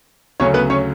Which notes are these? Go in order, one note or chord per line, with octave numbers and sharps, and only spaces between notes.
D2 C#3 F#3 C#4 C#5
B3 B4
C#4 C#5